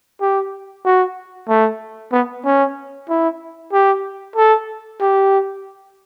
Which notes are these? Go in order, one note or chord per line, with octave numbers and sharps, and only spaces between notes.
G4
F#4
A3
B3
C#4
E4
G4
A4
G4